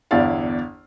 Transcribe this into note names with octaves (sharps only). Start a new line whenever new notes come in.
G1 E2 D4 E4 D5 F5